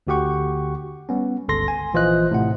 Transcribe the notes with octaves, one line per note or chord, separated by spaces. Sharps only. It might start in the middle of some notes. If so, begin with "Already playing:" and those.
D2 D3 F#4 G4 F#5 C#6
G3 B3 C#4
G1 C#2 A4 C6 A#6
G#5
A#1 E3 F4 C5 D#5 F#6
A2 C3 F#5